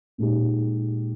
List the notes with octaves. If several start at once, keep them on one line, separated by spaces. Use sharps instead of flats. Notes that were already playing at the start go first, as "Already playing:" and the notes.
A#2 G#3 D#4 G4